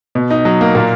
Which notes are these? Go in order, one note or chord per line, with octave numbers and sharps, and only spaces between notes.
B2
D#4
F#3
A#3
A#2